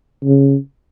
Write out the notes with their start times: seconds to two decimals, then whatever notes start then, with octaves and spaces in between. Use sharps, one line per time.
0.24 C#3